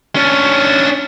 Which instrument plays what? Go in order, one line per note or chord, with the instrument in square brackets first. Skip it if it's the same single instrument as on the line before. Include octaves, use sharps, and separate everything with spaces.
[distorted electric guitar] C#4 D4